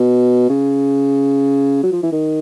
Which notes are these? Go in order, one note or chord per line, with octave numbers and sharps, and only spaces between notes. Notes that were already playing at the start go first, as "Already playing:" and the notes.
Already playing: B2
C#3
F#3
F3
E3
D#3